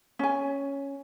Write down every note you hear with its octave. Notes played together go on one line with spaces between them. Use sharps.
C#4 G#5